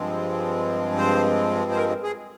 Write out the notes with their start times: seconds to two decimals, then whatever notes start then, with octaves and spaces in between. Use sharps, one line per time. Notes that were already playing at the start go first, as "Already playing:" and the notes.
Already playing: G2 F3 G#3 C4
0.97 C5
1.71 C5
1.77 A#4
2.04 G#4